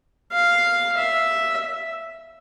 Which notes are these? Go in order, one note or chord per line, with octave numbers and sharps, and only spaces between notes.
F5
E5